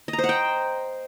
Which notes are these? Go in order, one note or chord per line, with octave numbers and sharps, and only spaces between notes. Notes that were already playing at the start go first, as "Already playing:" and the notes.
D#5
A#5
C5
F#5
G5